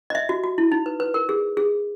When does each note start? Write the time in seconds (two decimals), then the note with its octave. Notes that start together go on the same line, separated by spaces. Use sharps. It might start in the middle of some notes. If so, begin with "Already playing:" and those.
0.10 D#5
0.15 E5
0.29 F#4
0.44 F#4
0.58 E4
0.72 D#4
0.86 B4
1.00 B4
1.14 A#4
1.29 G#4
1.57 G#4